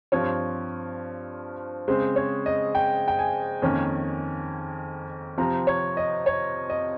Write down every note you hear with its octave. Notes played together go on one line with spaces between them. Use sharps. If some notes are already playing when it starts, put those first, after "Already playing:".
G2 F3 C4 C#5
C#3 G#3 C4 C5
C#5
D#5
G5
G5
G#5
F2 D#3 A#3 C#4
C3 F3 C4 A#5
C#5
D#5
C#5
D#5